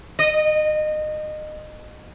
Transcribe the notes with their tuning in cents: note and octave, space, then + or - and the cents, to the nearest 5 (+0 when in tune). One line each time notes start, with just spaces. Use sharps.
D#5 -25